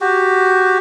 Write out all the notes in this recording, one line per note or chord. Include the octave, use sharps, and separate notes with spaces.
F#4 G4